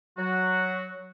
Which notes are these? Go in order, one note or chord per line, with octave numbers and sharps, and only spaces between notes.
F#3 F#4